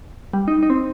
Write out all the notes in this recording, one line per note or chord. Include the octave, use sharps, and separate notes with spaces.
G3
D#4
D#4
C4